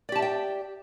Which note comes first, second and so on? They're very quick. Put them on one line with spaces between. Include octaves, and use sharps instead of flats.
D5 G4 A5 E5 G5